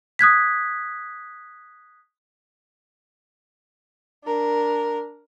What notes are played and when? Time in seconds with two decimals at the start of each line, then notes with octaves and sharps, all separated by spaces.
0.19 D#6 F#6 G#6 B6
4.25 D4 A#4